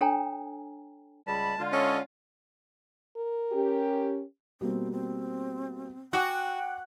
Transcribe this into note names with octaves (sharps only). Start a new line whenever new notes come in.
D4 A4 C#5 G5 G#5 A#5
C#2 G3 A5 B5
D3 G#3 F4
C#4 A4 C#5 D#5
A#4
C#4 G4
B2 G3 A#3 C4
C4
F#4 G5 G#5 D6 F#6